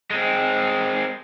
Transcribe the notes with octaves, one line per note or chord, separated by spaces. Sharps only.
G#3 C4